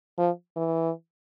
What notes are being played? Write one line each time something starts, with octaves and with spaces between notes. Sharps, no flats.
F3
E3